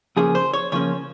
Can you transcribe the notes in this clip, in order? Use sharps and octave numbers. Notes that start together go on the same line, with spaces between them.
C#3 F3 A#3 C#4 G#4
C5
C#5
C#3 F3 A#3 C#4 C#5